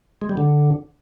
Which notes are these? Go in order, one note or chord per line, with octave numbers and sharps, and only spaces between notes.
G#3
G3
D3